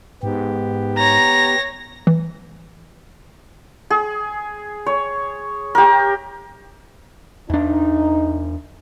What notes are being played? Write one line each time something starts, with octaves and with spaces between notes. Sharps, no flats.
G#2 B3 G4
C#5 A#5 A#6
E3
G#4
C#5
G4 A#4
E2 D4 D#4